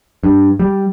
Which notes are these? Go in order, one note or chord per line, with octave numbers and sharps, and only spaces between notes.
G2
G3